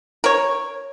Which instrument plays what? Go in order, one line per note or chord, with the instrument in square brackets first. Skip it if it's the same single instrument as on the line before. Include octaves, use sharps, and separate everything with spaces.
[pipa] A#4 C#5